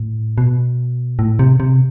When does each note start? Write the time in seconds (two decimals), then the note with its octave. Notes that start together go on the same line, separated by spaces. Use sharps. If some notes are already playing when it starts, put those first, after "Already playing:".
Already playing: A2
0.38 B2
1.19 A2
1.39 C3
1.60 C3